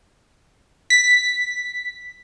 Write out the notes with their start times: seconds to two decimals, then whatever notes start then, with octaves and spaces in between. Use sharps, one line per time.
0.90 B6